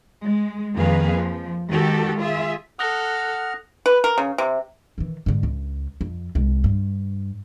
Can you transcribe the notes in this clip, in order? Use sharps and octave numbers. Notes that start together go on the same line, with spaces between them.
G#3
F2 D#3 A#3 G#4 B4 F5
F3
D#3 G#3 F#4 G4 A4
F4 G#4 E5
A4 F#5 D#6 F6 F#6 A#6
B4
A#4
C#3
C3
D#3 E3
G#2 D3
C#2
F2
C2 G#3
G2